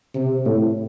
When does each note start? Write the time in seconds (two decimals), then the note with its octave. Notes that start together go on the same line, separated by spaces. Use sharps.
0.15 C3
0.45 A2